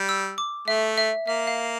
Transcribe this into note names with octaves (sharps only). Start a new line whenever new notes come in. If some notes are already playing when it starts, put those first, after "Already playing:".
Already playing: G3
E6
D6
A3 E5
E5
A#3 E5
F5